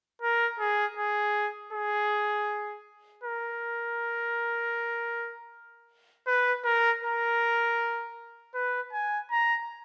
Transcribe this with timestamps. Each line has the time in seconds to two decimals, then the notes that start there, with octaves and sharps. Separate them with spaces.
0.21 A#4
0.59 G#4
0.97 G#4
1.73 G#4
3.24 A#4
6.27 B4
6.65 A#4
7.03 A#4
8.54 B4
8.93 G#5
9.31 A#5